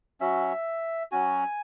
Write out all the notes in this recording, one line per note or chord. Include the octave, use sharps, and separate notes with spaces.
F#3 C#4 F#4 E5
F#3 C#4 F#4 G#5